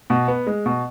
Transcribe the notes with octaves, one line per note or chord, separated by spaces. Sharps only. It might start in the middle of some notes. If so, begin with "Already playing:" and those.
B2
B3
G#3
B2